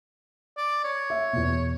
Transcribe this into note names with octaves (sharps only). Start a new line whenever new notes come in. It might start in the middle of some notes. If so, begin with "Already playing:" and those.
D5
C#5
E5
E2 B2